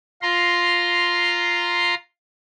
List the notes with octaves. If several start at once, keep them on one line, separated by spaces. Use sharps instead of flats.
F4 A#5 C6